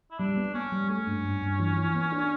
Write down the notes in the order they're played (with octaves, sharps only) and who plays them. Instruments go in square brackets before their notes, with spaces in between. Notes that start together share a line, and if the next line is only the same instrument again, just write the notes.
[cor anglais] E4
[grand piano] G3 [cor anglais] D4
[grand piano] B3
[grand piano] B3 [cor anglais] C#4
[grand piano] G3
[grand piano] A3 [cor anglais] C#4
[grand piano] G2
G2
G2
E3
E3
B3
D4